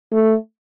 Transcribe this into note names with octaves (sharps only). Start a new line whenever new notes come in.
A3